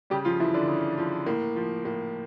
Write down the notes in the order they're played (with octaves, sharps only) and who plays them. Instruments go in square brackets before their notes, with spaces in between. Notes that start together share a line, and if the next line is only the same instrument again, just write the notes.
[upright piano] C#3 G3 G4
F3 F4
E3 F3 E4
D3 D4
C#3
F3
A2 A#3
F3
A2 A#3